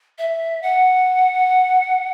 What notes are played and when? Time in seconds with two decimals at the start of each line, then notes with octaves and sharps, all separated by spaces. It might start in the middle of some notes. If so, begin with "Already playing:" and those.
0.19 E5
0.63 F#5